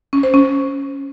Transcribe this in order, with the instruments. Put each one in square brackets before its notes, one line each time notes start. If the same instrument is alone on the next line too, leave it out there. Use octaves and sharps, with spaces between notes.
[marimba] C#4
C5
C#4